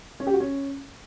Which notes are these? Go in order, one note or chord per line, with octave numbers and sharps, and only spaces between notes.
C#4
G4
F#4
C#4